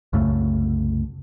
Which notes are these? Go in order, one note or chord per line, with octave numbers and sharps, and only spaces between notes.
C2 F#2 C#3 A3